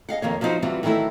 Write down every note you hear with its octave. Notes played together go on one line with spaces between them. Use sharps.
G#4 D#5 F5 F#5
F2 D#3 A#3 C#5
F3 F#3 B3 C4 D#4 C5
E3 F#3 G3 B3 C4 F4
D#3 E3 F#3 A3 E4